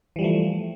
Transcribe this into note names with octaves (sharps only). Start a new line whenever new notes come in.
E3 F3 G3 A3